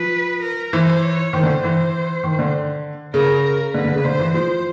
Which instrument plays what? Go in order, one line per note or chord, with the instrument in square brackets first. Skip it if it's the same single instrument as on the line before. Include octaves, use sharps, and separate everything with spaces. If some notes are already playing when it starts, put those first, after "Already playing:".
Already playing: [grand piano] F3 [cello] B4
[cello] A#4
[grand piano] E3 [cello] C5
[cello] C#5
[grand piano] D#3 [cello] C5
[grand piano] D3
[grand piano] E3 [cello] C5
[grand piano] D#3
D3
[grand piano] C#3 [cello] A#4
[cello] A#4
[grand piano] D3 [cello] B4
[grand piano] D3
C#3
[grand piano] D3 [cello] C5
[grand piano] E3
[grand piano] F3 [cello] C5